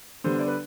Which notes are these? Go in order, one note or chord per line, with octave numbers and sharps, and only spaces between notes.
D3 G3 B3 C5
D5
B4